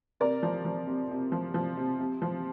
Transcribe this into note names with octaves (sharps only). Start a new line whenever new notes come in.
C3 A#4 D5
F3
F3
C3
C3
F3
F3
C3
C3
F3